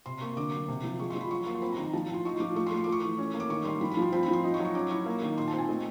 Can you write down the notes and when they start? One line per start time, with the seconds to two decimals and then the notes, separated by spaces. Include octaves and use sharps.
0.06 C3 C6
0.21 A#3 C#6
0.37 D3 D6
0.53 F#3
0.68 C3
0.84 F3
0.99 G#3 C#6
1.10 F3 C6
1.21 B5
1.31 F#3 C#6
1.46 A#3 C#6
1.55 C6
1.62 C4 B5
1.72 A#5
1.77 D#3
1.83 A#5
1.93 F3 A5
2.09 A2
2.14 C6
2.25 D#4 C#6
2.40 F3 D6
2.56 A3 C#6
2.67 C6
2.72 A3
2.77 C#6
2.84 A3 D6
2.92 C#6
3.02 E3
3.18 C#4
3.34 A#3
3.40 D6
3.50 D#3 C#6
3.65 G3 C6
3.81 F3 B5
3.91 B5
3.97 F3 C6
4.12 C4 B5
4.23 B5
4.28 F3 C6
4.44 D#4
4.54 C#6
4.59 F#3
4.65 C#6
4.74 C#4 D6
4.90 E4 C#6
5.06 A#3
5.22 D#3
5.38 A#2 C6
5.48 A5
5.53 C4
5.58 G#5
5.68 A3 D#5